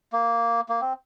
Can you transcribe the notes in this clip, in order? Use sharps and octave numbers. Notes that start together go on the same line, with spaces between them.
A#3
A#3
C4